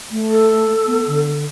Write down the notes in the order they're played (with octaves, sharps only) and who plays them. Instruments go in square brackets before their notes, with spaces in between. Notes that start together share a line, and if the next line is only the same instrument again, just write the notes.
[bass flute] A3
[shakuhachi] A4
[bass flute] B3
D3